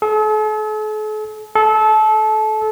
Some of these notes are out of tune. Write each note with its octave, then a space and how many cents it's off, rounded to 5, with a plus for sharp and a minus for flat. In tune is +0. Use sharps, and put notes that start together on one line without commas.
A4 -45
A4 -25